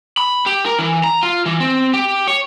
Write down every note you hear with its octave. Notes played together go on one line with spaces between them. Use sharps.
B5
G4
A#4
E3
A#5
F4
E3
C4
G4
C#5